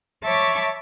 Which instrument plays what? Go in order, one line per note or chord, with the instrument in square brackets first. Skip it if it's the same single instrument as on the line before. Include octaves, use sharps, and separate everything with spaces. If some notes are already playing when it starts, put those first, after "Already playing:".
[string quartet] C#5 E5 A5 B5 C#6 D6